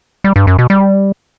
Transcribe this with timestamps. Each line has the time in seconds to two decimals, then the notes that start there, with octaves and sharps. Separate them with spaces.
0.24 G3
0.36 G2
0.47 F#2
0.59 B2
0.70 G3